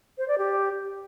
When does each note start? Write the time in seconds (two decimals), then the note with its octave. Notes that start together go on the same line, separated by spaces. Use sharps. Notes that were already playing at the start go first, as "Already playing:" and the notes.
0.18 C5
0.28 D5
0.38 G4